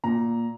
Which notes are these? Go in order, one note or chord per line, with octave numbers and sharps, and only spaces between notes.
A#2 A#5